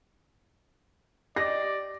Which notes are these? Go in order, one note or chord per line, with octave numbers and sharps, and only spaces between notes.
G4 D5 D#5 A#6